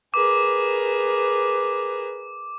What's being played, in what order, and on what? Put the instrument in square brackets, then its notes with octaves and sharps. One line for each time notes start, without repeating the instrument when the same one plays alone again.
[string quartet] G#4 A#4 B4 [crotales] D6